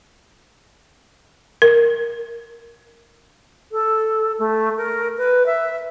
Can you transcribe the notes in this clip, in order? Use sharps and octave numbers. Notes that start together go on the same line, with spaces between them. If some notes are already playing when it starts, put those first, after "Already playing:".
A#4
A4
A3
A#4
B4
E5